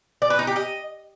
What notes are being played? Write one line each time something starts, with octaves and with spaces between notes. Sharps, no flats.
D5
B4
D#4
G4
D#5